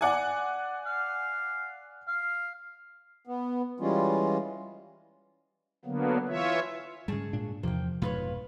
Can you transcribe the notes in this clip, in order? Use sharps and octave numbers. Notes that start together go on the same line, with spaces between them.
D5 F#5 G#5
F5
F5
B3
E3 G3 G#3 C#4 F4
D3 F#3 A#3 B3
E3 F4 C#5 E5
G#2 C#3 G3 G#4 A5 C#6
A#2 D4
E2 C3 F3 A#3 G5
F1 B1 G#2 B2 F4 B4 C#5